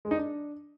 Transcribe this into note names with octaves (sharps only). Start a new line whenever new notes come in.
G#3
D#4
D4